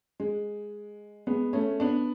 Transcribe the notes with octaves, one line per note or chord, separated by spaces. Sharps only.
G#3
G#3 B3
A3 C#4
B3 D4